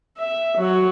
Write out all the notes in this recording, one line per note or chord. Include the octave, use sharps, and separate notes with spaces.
E5
F#3